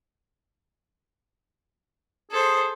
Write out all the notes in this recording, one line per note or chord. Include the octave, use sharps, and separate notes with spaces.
G#4 A4 C5